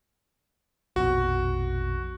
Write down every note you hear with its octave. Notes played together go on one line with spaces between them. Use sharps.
A#1 F2 B2 F#4